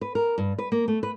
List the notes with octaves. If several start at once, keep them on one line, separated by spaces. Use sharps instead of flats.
B4
A#4
G2
B4
A#3
A3
B4